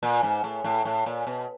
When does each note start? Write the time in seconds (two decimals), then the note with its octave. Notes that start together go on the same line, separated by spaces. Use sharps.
0.03 A#2
0.23 G#2
0.44 A2
0.64 A2
0.85 A2
1.06 A#2
1.27 B2